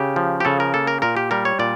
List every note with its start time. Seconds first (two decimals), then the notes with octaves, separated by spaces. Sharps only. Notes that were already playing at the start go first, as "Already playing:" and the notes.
Already playing: C#3 G4
0.16 F3
0.40 G4
0.45 C#3 A4
0.60 A#4
0.74 A#3 A4
0.87 A#4
1.02 A#2 A#4
1.17 G4
1.31 G3 A#4
1.45 C#5
1.59 A#2 D5